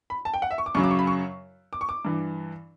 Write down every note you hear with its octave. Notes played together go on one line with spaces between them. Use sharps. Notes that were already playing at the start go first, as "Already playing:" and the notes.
B5
A5
G5
F#5
E5
C#6
D6
F#2 C#3 F#3 C#6
D6
C#6
B5
C#6
D6
C#6
D6
G2 E3